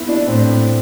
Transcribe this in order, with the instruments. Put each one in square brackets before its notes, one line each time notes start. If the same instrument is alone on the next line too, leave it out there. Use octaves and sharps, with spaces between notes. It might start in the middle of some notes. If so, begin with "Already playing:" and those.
Already playing: [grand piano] B3 E4
D4
[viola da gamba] A2 [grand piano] C4